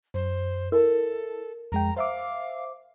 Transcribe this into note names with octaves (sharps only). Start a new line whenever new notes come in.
F#2 C5
E4 A4 A#4
F2 G#3 G5 A#5
C5 E5 F5 D6